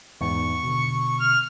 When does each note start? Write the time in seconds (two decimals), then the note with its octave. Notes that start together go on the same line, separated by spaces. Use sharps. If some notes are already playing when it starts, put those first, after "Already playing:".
0.21 E2 G#2 C#6
0.63 B2 D3
1.20 F6